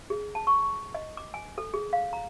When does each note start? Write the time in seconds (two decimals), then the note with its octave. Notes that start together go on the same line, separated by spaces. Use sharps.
0.10 G#4
0.35 A5
0.47 C#6
0.63 C#6
0.95 D#5
1.17 D6
1.34 G#5
1.58 A4
1.74 G#4
1.93 F5
2.13 A#5